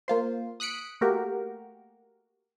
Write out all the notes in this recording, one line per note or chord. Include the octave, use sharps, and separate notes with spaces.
A#3 F4 C5
D#6 F#6 B6 C#7 D7
A3 A#3 F#4 G4 A#4